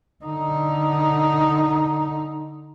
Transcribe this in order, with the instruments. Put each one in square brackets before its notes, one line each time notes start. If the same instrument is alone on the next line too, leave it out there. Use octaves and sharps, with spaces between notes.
[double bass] D3 D#4